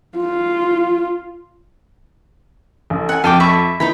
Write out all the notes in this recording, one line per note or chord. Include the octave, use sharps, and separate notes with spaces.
F4
A1
F#5 G#5
F2 F5 G5 A5 D6 D#7
E5 B5 C#6
E3 D#4 A#5 B5